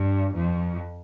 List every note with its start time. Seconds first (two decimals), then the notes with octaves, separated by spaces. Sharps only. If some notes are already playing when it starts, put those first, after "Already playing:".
Already playing: G2
0.34 F2